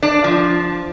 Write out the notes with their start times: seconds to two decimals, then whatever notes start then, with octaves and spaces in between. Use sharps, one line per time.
0.03 D4
0.24 F3